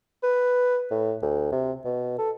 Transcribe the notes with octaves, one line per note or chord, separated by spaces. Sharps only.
B4
A2
D2
C3
B2
A4